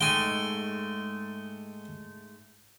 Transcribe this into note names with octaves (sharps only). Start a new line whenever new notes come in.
G#2 G#3 A3 G5 G#5